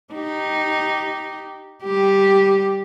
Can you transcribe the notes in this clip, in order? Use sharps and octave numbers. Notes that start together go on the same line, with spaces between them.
D#4 G4
G3 G4